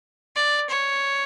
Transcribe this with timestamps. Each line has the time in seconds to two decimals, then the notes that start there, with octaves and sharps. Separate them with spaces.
0.36 D5
0.70 C#5